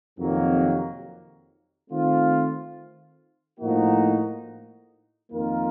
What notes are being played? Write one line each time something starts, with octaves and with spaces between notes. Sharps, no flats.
F2 C3 D#3 F#3 A#3
D#3 A3 C4 F4
A2 F3 A#3 D#4 F#4
F2 D#3 A#3 F4 A#4